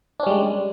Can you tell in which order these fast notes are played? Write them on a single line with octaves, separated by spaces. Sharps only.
D4 C#4 G3 G#3